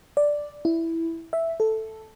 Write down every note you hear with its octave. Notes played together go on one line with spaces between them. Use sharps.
D5
E4
E5
A4